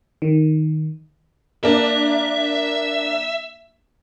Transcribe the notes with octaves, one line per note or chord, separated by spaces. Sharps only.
D#3
A#3 D4 E5